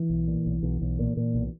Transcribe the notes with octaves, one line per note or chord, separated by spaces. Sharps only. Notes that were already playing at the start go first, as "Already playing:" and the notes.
Already playing: E3
B1
A#2
B1
B1
B1
A#2
A#2
B1